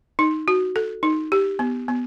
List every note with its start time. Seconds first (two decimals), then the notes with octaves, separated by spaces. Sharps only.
0.19 D#4
0.48 F#4
0.76 A4
1.03 D#4
1.32 G4
1.59 B3
1.88 B3